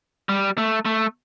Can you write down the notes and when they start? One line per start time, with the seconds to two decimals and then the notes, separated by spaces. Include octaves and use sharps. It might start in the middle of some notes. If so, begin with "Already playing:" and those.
0.29 G3
0.58 A3
0.85 A3